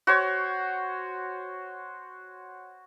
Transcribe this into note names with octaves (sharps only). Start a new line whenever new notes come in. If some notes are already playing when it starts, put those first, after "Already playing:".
F#4 C5 C#5